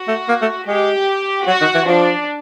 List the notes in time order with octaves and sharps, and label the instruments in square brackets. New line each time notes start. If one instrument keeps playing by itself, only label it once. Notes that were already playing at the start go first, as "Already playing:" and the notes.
Already playing: [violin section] F#4
[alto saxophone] A3
A#3
A3
[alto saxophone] G#3 [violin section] G4
[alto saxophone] F#3 [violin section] F#4
[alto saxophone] D#3
E3
[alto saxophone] F3 [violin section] D4